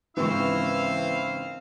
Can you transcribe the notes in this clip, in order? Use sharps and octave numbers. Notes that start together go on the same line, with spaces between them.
G#1 C#3 E3 C4 E4 C5 F5 C#6